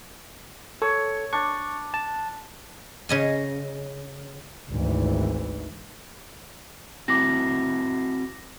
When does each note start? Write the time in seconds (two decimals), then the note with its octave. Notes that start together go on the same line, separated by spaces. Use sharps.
0.82 A4 C#5
1.33 D4 C#6
1.94 A5
3.09 C#3 D#5 G#5
4.71 G#1 D2 E3
7.08 C4 E4 F#4 D6 A#6